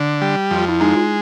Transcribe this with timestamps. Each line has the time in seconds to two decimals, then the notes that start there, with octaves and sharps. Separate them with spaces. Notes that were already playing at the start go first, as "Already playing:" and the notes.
Already playing: D3
0.21 G3
0.51 F2
0.56 F4
0.68 E4
0.80 G#3 D#4
0.95 F4